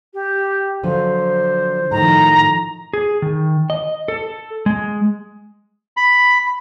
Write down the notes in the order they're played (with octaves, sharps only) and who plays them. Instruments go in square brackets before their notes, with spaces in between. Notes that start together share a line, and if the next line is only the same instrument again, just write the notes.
[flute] G4
[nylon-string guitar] D3 F3 F#3 [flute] C5
[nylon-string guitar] A2 [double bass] D#3 F3 [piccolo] A#5
[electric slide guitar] G#4
D#3
D#5
A4
G#3
[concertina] B5